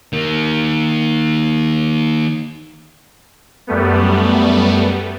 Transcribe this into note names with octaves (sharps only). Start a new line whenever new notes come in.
D#3 A#3
F#2 G3 A3 B3